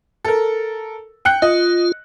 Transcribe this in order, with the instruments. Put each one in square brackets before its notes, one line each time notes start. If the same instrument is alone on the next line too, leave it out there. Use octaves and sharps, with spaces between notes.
[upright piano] A4 A#4
G5 F#6 C#7
[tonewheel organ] F4 [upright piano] D#5